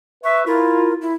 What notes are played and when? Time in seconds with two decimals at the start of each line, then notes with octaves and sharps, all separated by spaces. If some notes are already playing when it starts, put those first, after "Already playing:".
0.24 B4 E5 C#6
0.47 E4 F4 A#4
1.01 E4